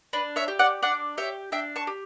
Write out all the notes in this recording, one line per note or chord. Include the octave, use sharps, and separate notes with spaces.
D4 B4
C#5 E5
G4
D5 F#5
D4 D5 F#5
G4 C#5 E5
D4 E5 G5
A5 C#6
G4